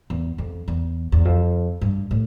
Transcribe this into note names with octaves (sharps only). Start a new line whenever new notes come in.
E2
F2
E2
E2
F2
G2
A2